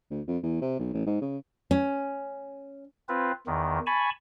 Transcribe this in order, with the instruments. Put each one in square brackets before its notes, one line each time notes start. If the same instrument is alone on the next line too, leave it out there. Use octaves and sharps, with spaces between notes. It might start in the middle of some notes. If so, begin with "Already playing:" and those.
[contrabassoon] D2
F2
E2
C3
B1
A1
G#2
C#3
[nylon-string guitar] C#4
[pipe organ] C4 F4 B4
E2 D#3
G#5 A5 B5 C#6